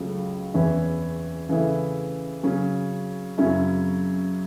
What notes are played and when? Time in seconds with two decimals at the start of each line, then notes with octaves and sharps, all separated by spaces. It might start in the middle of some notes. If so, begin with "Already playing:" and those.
Already playing: C#2 C#3 F#3 A3
0.54 E2 E3 C#4 E4
1.49 C#3 E3 A3 E4
2.43 C#3 F#3 C#4
3.38 F#2 C#3 F#3 C#4 E4